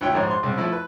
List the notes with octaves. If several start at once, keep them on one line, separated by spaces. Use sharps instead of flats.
D2 E4 C#5 G5
A#1 G#2 C5 C#5
C6
C2 C#3 C4
F3 A3 E4
B4